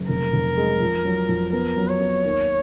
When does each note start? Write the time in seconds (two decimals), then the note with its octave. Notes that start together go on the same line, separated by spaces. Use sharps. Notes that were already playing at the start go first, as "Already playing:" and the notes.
Already playing: F#1
0.09 F1 A#4
0.33 F1
0.57 G#3
0.80 F2
1.05 F#3
1.29 F2
1.53 B3 A#4
1.77 F#3
1.88 C#5
2.00 B3
2.24 D#2